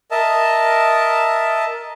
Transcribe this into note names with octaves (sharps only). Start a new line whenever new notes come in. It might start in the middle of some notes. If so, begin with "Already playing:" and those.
A#4 D#5 E5 A5